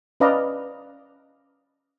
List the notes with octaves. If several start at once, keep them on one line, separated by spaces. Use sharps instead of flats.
C#4 B4 D5 D#5 F5 A#5